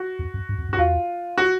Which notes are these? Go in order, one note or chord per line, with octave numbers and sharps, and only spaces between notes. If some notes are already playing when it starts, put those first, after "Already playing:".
Already playing: F#4
F2
F#2
G2
F2
F#2
F#4
E2 F4
F#4